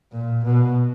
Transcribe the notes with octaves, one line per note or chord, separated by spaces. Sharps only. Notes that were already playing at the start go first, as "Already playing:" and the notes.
A#2
B2